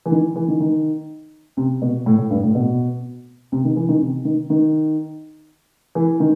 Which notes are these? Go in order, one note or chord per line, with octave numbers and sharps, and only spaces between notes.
E3
D#3
E3
D#3
D#3
C3
B2
A2
A2
G2
A2
B2
C3
D#3
E3
D#3
C3
D#3
D#3
E3
D#3